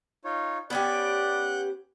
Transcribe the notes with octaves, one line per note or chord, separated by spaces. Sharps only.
D#4 F4 C#5
B3 C#4 G4 D5 F#5 F#6 G6